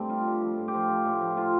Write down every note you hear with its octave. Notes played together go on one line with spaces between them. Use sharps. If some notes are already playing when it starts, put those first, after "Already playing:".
Already playing: G2 A3 C4
G3 F4
G3
F3
A2
G4
F3 F4
F3
A2
F3
F3 F4